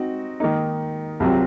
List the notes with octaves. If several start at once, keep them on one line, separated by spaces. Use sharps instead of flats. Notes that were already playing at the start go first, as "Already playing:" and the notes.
Already playing: C4 D#4 F#4
D#3 A#3 D#4
C2 C3 F#3 C4 F4